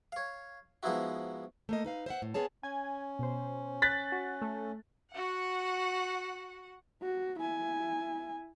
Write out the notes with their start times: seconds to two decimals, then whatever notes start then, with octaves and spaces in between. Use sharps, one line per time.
0.12 C#5 F5
0.83 G#2 F3 B3 D#4 E4 F#4
1.69 A3 A#3 D#5
1.84 D#4 B4 F5
2.06 C5 E5 F#5
2.22 A2
2.34 B3 C#4 G#4 C#5 A5
2.63 C#4 G#5 G#6
3.19 B2 C5
3.82 F#6 A6 B6
4.12 F#4
4.42 A3
5.12 F#4 F#5
7.02 F#4
7.40 E4 G#5